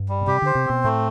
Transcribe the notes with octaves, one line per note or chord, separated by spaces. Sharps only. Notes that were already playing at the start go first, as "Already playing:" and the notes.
Already playing: G2
G3
B2
C3 G4
D3 C5
C3
B2 C4
A2 A3